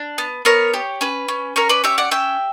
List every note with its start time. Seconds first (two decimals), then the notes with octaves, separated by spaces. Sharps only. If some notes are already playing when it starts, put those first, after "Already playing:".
Already playing: D4
0.18 B3
0.45 B3 A#4 C#5
0.74 G4
1.01 C#4 B4
1.28 C#4
1.56 C#4 A#4 C#5
1.69 B4 D5
1.84 G4 C#5 E5
1.98 D5 F#5
2.11 C#4 E5 G5